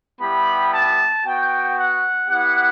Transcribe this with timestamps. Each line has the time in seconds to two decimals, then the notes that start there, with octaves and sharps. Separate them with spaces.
0.21 G3 B3 E4 G4 B5
0.73 A5
1.25 B3 F#4 G5
1.78 F#5
2.29 B3 E4 G4 F#5